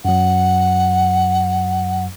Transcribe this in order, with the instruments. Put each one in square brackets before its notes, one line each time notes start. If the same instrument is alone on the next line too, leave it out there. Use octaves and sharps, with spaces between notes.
[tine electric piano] F#2 F#3 [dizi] F#5